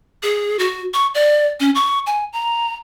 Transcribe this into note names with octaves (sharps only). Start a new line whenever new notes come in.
G#4
F#4
C#6
D5
C#4
C#6
G#5
A#5